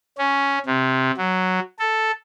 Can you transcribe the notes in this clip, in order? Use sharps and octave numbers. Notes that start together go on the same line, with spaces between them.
C#4
C3
F#3
A4